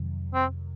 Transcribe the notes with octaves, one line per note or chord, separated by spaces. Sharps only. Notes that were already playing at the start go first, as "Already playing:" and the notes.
Already playing: F2 C3 D#3 F#3
C4